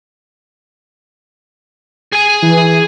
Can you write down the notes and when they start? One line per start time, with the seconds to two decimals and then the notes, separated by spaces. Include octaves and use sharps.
2.13 G#4 G#5
2.42 E3